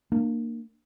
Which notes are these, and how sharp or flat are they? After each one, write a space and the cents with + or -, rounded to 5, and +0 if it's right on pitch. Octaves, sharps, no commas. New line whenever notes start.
A#3 -10 D4 +30